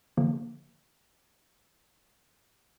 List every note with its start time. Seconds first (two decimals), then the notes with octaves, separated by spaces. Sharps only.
0.17 D3 F3 A#3